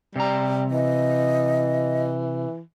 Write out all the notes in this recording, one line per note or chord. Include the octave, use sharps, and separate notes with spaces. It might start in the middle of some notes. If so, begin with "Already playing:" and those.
C3 G3 A#5
E3 D#5